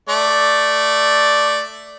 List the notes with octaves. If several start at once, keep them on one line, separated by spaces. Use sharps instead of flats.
A3 D5